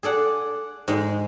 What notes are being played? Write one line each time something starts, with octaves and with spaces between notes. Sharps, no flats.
G#4 A4 D5 F#5
G#2 G#3